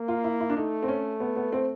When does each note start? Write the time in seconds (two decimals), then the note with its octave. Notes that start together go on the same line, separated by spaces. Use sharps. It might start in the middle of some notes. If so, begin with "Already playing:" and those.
Already playing: A#3
0.08 F4
0.24 E4
0.40 E4
0.50 D4
0.57 A3 D#4
0.82 C4
0.88 C#4
1.20 B3
1.36 B3
1.52 C4